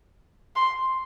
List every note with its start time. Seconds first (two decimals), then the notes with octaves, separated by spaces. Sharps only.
0.56 C6